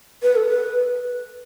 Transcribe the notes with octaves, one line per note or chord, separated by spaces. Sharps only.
B4
A4
B4